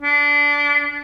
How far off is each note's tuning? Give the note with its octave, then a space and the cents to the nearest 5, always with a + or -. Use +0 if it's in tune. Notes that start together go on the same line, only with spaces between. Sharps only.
D4 -20